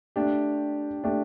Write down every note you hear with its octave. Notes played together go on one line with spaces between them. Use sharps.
A3 D4 G4
A3 D4 G4